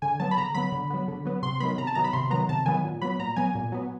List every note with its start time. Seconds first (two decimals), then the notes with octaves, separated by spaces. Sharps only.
0.02 D3 G#5
0.20 F#3 B3 A5
0.31 B5
0.38 D3 A#5
0.55 F#3 B3 B5
0.72 D3
0.90 F#3 B3
1.08 D3
1.25 F#3 B3
1.43 C3 C6
1.60 D#3 F#3 B3 B5
1.78 C3 A#5
1.87 A5
1.95 D#3 F#3 B3 A#5
2.04 B5
2.13 C3 C6
2.30 D#3 F#3 B3 A#5
2.49 C3 A5
2.66 D#3 F#3 B3 G#5
2.84 A#2
3.02 F#3 B3 B5
3.19 A#2 A#5
3.36 F#3 B3 G#5
3.55 A#2
3.72 F#3 B3